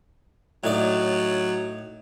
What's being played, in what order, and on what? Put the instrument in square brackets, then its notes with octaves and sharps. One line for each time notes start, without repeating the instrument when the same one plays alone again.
[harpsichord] A2 D#4 D5 [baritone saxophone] F#3